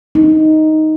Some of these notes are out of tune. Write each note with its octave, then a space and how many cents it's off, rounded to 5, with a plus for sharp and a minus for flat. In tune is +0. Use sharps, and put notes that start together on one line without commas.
D#4 +5